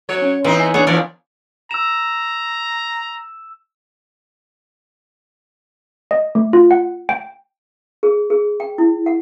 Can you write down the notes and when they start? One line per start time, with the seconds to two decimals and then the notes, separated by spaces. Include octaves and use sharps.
0.09 F#3 C#5
0.22 C#4
0.44 E3 B3 C4 D#4
0.59 G#5
0.74 B3 D4 G#4 C#5
0.87 E3 F3 A#4 C#5 D5
1.71 A#5 E6 E7
6.11 D#5
6.35 A3
6.53 F4
6.71 F#5
7.09 G5
8.03 G#4
8.30 G#4
8.60 G5
8.78 E4
9.06 F#5